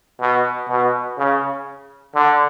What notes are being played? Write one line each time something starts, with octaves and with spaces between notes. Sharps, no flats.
B2
B2
C#3
D3